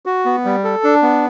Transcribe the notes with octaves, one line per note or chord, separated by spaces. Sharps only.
F#4
B3
G3
A4
D4
B3